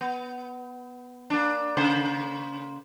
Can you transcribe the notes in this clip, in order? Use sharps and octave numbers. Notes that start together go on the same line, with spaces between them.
B3
A#3 D4
C#3 A#3 C5